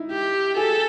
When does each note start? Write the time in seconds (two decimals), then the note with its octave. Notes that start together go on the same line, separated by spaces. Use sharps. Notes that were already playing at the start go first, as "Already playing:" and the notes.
Already playing: D#4 E4
0.11 G4
0.56 G#4 A4